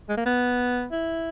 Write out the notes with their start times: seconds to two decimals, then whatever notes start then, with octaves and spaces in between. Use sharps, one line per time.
0.09 G#3
0.17 A#3
0.26 B3
0.92 E4